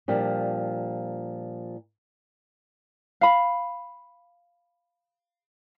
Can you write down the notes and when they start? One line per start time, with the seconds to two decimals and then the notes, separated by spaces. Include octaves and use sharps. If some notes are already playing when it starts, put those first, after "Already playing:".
0.08 A#2 F3 G3 D4
3.21 F5 B5